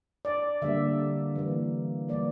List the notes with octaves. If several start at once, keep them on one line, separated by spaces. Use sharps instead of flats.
D5
D3 G3 A#3 E5
E3 G3 A#3
E3 G3 A#3 D5